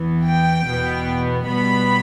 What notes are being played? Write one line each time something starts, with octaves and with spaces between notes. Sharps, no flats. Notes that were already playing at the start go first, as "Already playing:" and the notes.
Already playing: E2 E3 B3
G5
E2 B2 B3
B2 G3 B3 B5